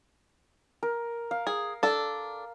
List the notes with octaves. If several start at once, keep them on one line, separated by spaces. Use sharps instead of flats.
A#4
F5
G#4
D4 A4